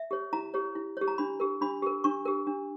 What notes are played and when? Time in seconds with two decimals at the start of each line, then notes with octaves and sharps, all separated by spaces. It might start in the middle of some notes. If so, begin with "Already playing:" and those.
Already playing: E5
0.11 G4 C#5
0.33 E4 A#5
0.54 G4 C#5
0.75 E4
0.97 G4 C#5
1.08 A#5
1.18 D4 B5
1.40 G4 A#4
1.61 D4 B5
1.82 G4 A#4
2.04 D4 C#6
2.25 G4 A#4
2.47 D4